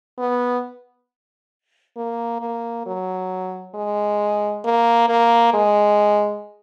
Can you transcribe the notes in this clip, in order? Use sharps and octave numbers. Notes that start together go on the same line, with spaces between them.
B3
A#3
A#3
F#3
G#3
A#3
A#3
G#3